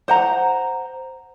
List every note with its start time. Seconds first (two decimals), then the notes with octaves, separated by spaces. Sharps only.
0.08 C5 F#5 A#5